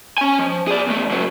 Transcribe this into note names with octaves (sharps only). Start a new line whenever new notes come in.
C#4 G#5
F3
G#4 D5
E2 A3
C#3 F#3